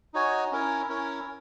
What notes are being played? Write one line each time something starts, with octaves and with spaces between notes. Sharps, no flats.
D#4 F#4 C#5 G#5
C#4 E4 A#4 C#5
C#4 E4 A#4 C#5